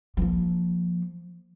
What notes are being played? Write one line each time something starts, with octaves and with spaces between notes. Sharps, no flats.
F3 A#3